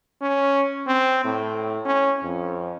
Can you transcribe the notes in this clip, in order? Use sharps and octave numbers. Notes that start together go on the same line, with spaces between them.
C#4
C4
A2
C#4
F2